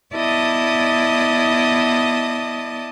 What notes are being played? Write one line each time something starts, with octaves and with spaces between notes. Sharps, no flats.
B3 E4 D5 D#5 A5 D#6